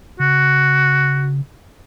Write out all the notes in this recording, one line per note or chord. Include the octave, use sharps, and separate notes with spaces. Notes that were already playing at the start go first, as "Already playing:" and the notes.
C#3 F#4